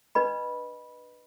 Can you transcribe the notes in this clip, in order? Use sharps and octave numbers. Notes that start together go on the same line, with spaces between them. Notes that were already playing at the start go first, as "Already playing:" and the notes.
D4 B4 D#5 B5